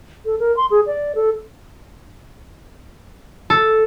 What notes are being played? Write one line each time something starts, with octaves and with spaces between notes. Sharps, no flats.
A4
A#4
C6
G#4
D5
A4
A4